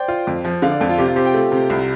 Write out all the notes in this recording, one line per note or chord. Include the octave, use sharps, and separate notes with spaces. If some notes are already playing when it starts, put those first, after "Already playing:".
Already playing: C5 D5 G5
F4
F2
F3
D3 F5
D5
F2 A4
F4
C3 G4
F4
C4 G4
G5
A3
C3
C2